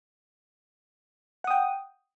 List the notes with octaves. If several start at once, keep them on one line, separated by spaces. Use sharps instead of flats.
F#5 G5 D#6